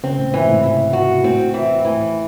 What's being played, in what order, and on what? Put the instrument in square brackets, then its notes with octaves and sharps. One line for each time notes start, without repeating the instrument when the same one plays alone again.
[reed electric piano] C#3 [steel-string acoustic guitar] C4
[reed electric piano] A2
[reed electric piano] G#2 [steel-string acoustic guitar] E3
[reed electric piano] C3
A2
[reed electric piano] C3 [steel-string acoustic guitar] E3
[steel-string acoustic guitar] F#4
[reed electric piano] A2 [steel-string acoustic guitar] C4
[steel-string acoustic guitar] E3
[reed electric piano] A2 [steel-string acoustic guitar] E3